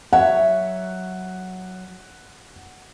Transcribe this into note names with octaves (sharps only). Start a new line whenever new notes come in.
F#3 C#5 E5 F#5